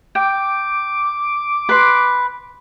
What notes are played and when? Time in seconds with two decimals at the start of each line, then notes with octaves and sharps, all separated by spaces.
0.15 G5 D6
1.69 B4 C6